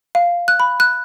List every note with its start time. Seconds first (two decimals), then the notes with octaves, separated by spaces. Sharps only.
0.15 F5
0.48 F#6
0.60 B5
0.80 F#6